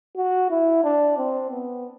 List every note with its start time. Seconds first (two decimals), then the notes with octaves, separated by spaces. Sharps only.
0.16 F#4
0.50 E4
0.84 D4
1.18 C4
1.51 B3